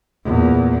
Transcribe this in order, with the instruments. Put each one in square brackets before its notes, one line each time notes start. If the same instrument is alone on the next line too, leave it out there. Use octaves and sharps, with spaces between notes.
[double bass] E2 A#2